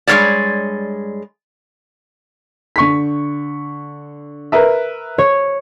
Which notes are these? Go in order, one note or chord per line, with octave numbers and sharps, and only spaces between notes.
G2 G#3 A3 A#4 C#5 D5
D3 C#6 B6
A#4 B4 E5
C#5